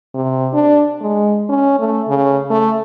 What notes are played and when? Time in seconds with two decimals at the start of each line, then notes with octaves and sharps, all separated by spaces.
0.15 C3
0.53 D4
1.01 G#3
1.49 C#4
1.79 A3
2.08 C#3
2.50 A3